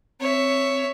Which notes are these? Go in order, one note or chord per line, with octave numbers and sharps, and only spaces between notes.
C4 C#5 E5